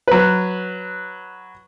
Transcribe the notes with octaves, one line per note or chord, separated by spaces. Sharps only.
F#3 B4